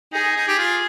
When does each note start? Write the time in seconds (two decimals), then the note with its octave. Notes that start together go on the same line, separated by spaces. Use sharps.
0.12 D#4 G#4
0.36 D#4
0.48 G4
0.59 F4